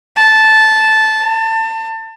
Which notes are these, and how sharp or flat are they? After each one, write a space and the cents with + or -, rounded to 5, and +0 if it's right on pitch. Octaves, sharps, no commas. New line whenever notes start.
A5 -10
A5 +30